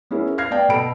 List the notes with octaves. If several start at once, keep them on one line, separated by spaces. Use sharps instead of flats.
B3 C#4 E4 G#4 A#4
F5 F6 G#6 A#6 C7
B3 D5 G5
B2 A4 B5 D7